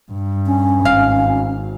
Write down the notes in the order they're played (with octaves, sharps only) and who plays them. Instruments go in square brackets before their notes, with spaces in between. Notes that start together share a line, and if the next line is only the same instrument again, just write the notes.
[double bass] G2
[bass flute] C#4
[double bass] G#1 [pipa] F5